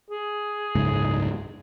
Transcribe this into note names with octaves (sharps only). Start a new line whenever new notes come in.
G#4
F#1 C#2 G#2